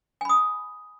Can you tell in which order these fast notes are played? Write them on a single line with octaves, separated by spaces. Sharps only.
G#5 B5 D#6